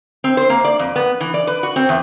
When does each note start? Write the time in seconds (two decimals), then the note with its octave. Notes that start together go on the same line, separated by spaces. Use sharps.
0.24 C4
0.37 C5
0.50 A#3
0.65 D5
0.79 F2
0.96 B3
1.21 E3
1.34 D5
1.47 B4
1.63 F#4
1.76 C4
1.89 E2